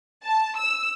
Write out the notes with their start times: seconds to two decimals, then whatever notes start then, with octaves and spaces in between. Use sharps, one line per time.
0.23 A5
0.56 E6